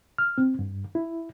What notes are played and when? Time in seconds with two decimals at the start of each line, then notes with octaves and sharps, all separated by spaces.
0.18 F6
0.38 C4
0.59 G2
0.95 E4